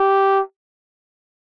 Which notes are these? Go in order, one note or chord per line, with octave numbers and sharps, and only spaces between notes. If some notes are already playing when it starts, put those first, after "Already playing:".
Already playing: G4